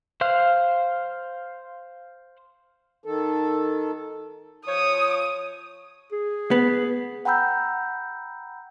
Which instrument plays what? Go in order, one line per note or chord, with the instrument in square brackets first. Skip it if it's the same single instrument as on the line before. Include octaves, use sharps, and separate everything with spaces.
[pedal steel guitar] C5 F5 F#6
[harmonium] D#3 A4
[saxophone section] F3 C#5 [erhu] D#6
[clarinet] G#4
[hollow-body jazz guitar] B3
[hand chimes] F#5 G5 A#5 B5 E6 G6